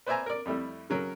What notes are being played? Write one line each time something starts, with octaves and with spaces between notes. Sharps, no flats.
B4 C5 D5 E5 G#5 A#5
A#4 D5
F2 G3 A3 E4
C#3 F#3 A#4